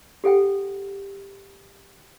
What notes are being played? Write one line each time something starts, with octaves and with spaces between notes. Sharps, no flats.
G4 A4 F#5 G5